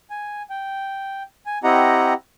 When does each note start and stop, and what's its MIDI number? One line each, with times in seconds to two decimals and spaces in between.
0.10 0.42 80
0.50 1.23 79
1.46 1.58 80
1.64 2.14 60
1.64 2.14 64
1.64 2.14 67
1.64 2.14 75
1.64 2.14 78
1.64 2.14 82